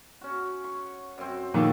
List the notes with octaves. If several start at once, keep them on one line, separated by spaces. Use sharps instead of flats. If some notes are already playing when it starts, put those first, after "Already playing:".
C#4 F#4
C#6
F#2 C4
A#2 D#3 F#4 A4